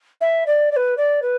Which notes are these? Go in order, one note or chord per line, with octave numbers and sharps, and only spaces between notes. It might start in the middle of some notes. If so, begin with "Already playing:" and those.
E5
D5
D5
B4
D5
B4